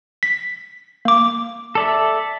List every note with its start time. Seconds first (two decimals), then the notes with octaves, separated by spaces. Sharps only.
0.23 B6
1.05 A#3 D6
1.75 A4 D5 E5